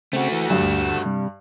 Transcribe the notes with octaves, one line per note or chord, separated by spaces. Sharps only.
C#3 A3 C4 F#4
E3
G2 D3 F#3 E6
D2
C3 G3